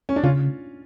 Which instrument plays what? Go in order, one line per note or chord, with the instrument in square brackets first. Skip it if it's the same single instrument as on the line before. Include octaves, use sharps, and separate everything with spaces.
[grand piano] C#4
D4
[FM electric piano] C#3 [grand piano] C#4 F4